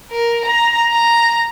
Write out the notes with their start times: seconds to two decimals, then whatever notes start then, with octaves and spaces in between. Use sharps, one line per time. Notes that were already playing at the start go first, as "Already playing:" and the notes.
0.11 A#4
0.45 A#5
0.90 A#5